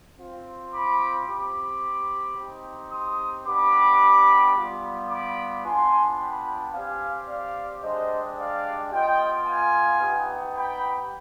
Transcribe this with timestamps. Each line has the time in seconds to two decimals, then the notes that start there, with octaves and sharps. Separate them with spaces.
0.18 C4 F4
0.73 B5 D6
1.28 C4 G4 B5 D6
2.36 C4 D#4 G4
2.91 C6 D#6
3.46 B3 D4 G4 B5 D6
4.55 G3 B3 F4
5.09 B5 D6
5.64 B3 D4 F4 G#5 C6
6.19 G5 B5
6.73 C4 G4 F5 G#5
7.28 D5 F5
7.83 G#3 D4 G4 C5 D#5
8.37 D5 F5
8.92 B3 F4 D#5 G5
9.46 F5 G#5
10.01 B3 D#4 G4
10.55 G5 B5